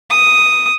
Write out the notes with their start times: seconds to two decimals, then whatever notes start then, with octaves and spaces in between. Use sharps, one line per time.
0.10 D#6